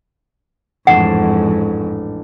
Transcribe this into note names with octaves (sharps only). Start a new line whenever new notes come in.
A1 F2 G#2 D4 F#5 E7